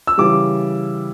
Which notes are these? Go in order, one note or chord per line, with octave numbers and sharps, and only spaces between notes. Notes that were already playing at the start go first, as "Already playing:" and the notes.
E6
C#3 E3 G3 D6